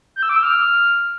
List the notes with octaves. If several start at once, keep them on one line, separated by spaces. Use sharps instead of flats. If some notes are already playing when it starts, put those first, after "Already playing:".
G6
E6
D6
E6
F6